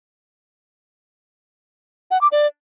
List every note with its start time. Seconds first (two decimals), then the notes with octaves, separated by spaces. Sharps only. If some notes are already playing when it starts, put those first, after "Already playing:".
2.11 F#5
2.21 D6
2.32 D5